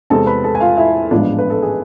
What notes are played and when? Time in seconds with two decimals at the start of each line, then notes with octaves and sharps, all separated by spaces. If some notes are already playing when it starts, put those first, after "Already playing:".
0.10 E2 C3 G#3 C4 A4 A5
0.27 B4 B5
0.44 A4 A5
0.55 G#5
0.60 F4 F5
0.77 E4 E5
1.11 A1 G#2 F3 B3 D4
1.38 B4
1.50 A4
1.62 G#4